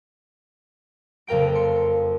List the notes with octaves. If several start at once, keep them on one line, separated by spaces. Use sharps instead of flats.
F#1 F2 A#4 G5 D7
C6 C#7